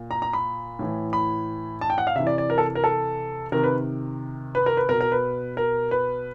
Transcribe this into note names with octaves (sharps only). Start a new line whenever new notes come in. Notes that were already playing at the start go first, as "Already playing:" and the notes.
Already playing: A#2
A#5
A#5
B5
A2 E3
B5
A5
G5
F#5
F5
C3 E3 E5
D5
D5
A#4
A4
A#4
A4
C3 D#3 A#4
B4
B4
A#4
B4
B2 A#4
A#4
B4
A#4
B4